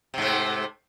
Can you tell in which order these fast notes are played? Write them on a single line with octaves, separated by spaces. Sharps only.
C3 G#2 A3